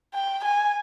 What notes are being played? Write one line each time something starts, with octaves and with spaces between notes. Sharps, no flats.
G5
G#5